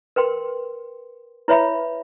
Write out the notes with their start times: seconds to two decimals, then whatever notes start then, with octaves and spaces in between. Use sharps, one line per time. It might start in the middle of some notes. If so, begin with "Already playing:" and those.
0.16 A#4 B4 G5 C6
1.48 E4 B4 C#5 E5 B5